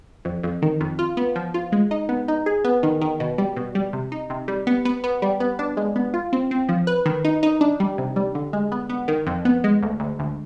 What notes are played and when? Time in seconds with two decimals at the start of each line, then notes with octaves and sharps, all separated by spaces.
0.25 F2
0.43 F2
0.62 D#3
0.80 F2
0.99 F4
1.17 B3
1.36 F3
1.54 F4
1.72 G#3
1.91 D#4
2.09 B3
2.28 D#4
2.46 G#4
2.64 B3
2.83 D#3
3.01 D#3
3.20 B2
3.38 G3
3.56 B2
3.75 G3
3.93 C3
4.12 D#4
4.30 C3
4.48 G3
4.67 B3
4.85 B3
5.04 B3
5.22 G3
5.40 B3
5.59 D4
5.77 G#3
5.96 B3
6.14 F4
6.33 C4
6.51 C4
6.69 F3
6.87 B4
7.06 D#3
7.25 D#4
7.43 D#4
7.61 D4
7.80 G3
7.98 C3
8.16 G3
8.35 D3
8.53 G#3
8.72 B3
8.90 B3
9.08 D#3
9.27 F2
9.45 B3
9.64 G#3
9.82 D2
10.00 D2
10.19 D2